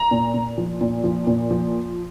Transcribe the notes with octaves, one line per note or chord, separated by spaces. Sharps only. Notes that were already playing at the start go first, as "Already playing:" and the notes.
Already playing: A#5
A#2
A#2
F3
A#2
F3
A#2
F3